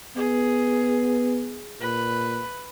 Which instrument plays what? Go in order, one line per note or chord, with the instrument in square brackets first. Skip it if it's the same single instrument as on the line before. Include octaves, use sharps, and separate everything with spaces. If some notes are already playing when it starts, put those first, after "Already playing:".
[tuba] B3 [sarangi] G#4
[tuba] A#2 [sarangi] B4